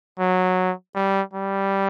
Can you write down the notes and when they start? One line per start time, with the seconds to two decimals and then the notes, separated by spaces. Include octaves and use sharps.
0.20 F#3
0.95 G3
1.33 G3